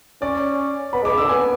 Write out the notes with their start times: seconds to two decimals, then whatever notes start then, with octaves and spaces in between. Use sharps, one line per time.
0.22 C#4 D5
0.93 B3 B5
1.03 G#3 D6
1.11 C#3
1.18 D3 E6
1.29 B3 G#5